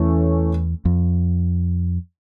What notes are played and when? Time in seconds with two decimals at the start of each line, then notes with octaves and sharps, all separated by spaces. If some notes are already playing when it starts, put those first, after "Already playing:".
Already playing: E2 E3 A3 C#4
0.85 F2